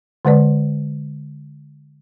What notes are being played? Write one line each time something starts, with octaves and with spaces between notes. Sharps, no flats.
D3 G#3 B4 D5